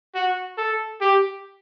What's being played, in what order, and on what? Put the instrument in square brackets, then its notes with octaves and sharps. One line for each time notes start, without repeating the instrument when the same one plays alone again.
[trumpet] F#4
A4
G4